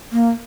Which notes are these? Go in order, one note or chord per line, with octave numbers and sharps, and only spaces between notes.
A#3